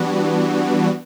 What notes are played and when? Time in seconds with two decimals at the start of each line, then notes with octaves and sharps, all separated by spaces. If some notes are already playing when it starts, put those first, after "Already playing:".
Already playing: E3 G3 B3 D4 F#4